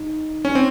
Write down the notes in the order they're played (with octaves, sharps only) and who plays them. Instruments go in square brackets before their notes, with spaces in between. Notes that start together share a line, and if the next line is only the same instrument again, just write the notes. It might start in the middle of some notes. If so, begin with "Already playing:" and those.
Already playing: [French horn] D#4
[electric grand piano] C#4
C4